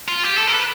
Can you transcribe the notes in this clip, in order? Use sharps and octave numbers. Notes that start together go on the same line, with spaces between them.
F4
G4
A4
A#4
B4